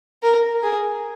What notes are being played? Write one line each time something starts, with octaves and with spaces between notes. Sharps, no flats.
A#4
G#4